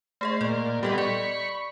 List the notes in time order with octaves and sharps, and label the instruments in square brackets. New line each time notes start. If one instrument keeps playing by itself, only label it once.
[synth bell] A3 G#4 D#5 [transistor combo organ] C5
[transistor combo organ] A#2 [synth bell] D5
[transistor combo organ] G3 B3 [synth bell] G4 A4 D#5
[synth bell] D5 [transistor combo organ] B5 C#6